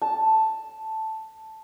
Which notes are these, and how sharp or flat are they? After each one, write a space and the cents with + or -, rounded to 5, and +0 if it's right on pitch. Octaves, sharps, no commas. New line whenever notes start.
A5 +0